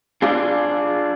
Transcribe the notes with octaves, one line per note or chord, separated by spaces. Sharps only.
D4 F4 G#4